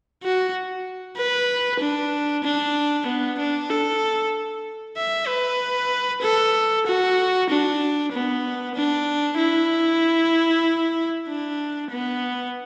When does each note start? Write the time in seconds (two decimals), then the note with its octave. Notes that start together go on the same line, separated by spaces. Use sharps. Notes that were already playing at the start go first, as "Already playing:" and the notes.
0.23 F#4
1.17 B4
1.80 D4
2.44 D4
3.07 B3
3.39 D4
3.70 A4
4.97 E5
5.28 B4
6.22 A4
6.86 F#4
7.49 D4
8.12 B3
8.75 D4
9.38 E4
11.28 D4
11.91 B3